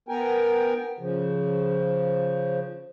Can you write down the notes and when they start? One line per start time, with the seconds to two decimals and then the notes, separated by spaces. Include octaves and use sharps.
0.09 B3 A#4 G5 G#5
0.99 C#3 F3